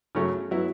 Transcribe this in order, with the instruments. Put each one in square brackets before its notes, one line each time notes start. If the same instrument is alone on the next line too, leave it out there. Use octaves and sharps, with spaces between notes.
[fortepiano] C#3 F#3 A3 C#4
F#3 B3 E4